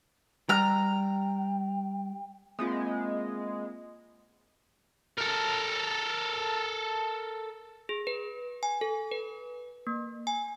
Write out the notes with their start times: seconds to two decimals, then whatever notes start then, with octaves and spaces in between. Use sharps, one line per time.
0.49 G3 G5 A#5 F6
2.59 G#3 A#3 C4 F4
5.18 A4 A#4
7.89 G#4
8.07 B4
8.63 G#5
8.81 A4
9.11 B4
9.87 A#3
10.27 G#5